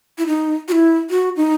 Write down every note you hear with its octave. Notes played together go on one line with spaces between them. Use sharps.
E4
D#4
F#4
E4
F#4
D#4